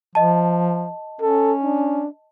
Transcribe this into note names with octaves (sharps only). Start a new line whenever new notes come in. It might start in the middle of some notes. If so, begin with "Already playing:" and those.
F3 D#5 A5
C#4 A4
D4